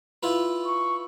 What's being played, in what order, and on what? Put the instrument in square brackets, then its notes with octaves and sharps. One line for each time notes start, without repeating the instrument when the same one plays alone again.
[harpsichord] E4 F4 B4
[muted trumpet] C#6